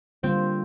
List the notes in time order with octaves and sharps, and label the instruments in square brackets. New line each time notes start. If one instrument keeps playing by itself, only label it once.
[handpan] D3 G3 A#3 F4 C5 [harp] C4